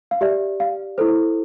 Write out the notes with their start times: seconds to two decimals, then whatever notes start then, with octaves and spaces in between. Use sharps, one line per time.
0.11 F5
0.21 G4 D5 E5
0.60 F5
0.98 E4 A4 C5